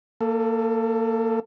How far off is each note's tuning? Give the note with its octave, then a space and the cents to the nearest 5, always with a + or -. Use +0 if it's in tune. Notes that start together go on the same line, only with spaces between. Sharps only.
A#3 -20 A4 +20